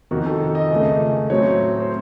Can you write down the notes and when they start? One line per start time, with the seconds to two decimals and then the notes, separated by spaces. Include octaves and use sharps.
0.11 F2 C3 D#3 F#4
0.26 A4
0.55 D#5
0.70 C#2 C#3 A3
1.30 A2 F#3 C4 C#5
1.79 C5